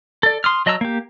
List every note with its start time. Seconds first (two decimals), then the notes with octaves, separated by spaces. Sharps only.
0.23 A4 D5
0.44 C6 D#6 F6
0.66 F#3 D#5 A5 A#5 E6
0.81 A#3 G4